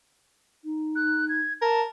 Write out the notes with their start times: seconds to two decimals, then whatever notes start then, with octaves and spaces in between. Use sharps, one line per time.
0.65 D#4
0.95 F#6
1.29 G#6
1.62 A#4 A5